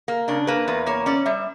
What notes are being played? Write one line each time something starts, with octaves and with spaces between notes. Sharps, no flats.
A#3
C#3 D4
A#3 B4
E2 B4
A#3 C#5
C#4 D5
G3 E5